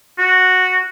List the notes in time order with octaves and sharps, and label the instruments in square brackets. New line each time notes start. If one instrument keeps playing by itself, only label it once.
[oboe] F#4